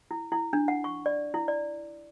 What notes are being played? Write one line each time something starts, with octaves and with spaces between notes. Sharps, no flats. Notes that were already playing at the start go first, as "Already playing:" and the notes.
E4
E4
D4
F#5
C#6
D5
E4
D5